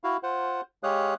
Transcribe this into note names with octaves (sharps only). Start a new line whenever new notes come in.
E4 F#4 F5
F4 C5 F#5
G#3 G4 C#5 F5 D#6 F#6